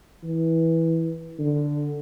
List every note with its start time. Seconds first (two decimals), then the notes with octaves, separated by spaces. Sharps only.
0.24 E3
1.39 D3